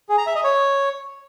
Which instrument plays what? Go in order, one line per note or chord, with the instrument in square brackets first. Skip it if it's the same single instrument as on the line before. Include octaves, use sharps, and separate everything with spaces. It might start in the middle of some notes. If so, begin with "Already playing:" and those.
[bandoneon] G#4
A#5
E5
D#5
C#5